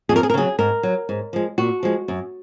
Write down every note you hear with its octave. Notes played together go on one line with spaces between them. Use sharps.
F2 G#4
A#4
G#4
A#4
C#3 F#3 G#4
G#2 A#4
F#3
G#2
F3 G#3
A#2 F#4
F3 G#3
F#2